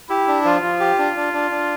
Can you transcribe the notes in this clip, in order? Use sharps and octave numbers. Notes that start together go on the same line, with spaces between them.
E4 G4
D4
F3 F4
F3
G4
D4
D4
D4
D4